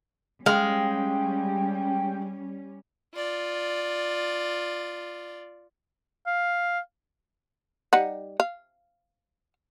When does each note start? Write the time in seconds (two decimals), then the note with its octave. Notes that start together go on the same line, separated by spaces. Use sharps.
0.46 G3 G#3 C#4 F5 G5
3.15 F4 D5
6.27 F5
7.93 G3 D#4 F#5
8.40 F5